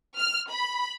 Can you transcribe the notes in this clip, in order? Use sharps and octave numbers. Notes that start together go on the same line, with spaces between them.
F6
B5